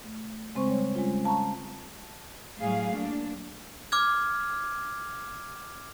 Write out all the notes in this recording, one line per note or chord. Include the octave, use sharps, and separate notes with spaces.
A3
C#3 G#3 C4 C5 C#6
G3 C#5
G3 G#3 C#4 F4
F5 A5 A#5 C#6
A2 F#3 G3 G#4 F5
A#3 D4
D6 F6 G#6